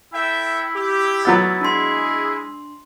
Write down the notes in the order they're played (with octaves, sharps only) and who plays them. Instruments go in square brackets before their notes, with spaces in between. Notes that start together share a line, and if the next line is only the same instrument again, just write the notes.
[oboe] E4 [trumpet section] A4 E5 G5
[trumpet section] G4
[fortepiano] F#3 B3 E6 [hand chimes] A6
[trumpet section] G#3 G#4 [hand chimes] D4 C6 [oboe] E4